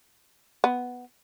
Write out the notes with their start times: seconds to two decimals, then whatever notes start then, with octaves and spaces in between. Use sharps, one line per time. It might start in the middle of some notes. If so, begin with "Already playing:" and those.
0.64 B3